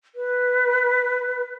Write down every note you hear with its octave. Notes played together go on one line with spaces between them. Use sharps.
B4